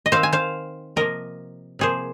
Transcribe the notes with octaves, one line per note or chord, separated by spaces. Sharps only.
D#5
D#3 C4 C5 F5
G#5
C5 F5
C3 F3 A#3 A#4 D#5
C3 F3 A#3 G#4 C5